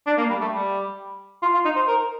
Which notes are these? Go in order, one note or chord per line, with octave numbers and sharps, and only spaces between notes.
D4
A#3
G3
A3
G3
F4
F4
D#4
C5
A#4